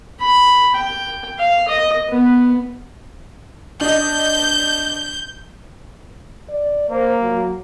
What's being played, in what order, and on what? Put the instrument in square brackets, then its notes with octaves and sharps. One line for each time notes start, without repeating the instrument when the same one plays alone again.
[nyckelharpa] B5
G5
F5
D#5
B3
[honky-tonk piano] D4 D#5 [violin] G6
[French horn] D5
[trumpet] A#3 [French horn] C5
[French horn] F#3